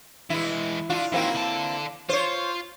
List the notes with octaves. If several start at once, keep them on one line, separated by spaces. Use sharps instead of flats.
E3 G#3 E4
D3 D4 F4
D#3 F#3 A#3 C4 E4
D3 A5
F4 C5 C#5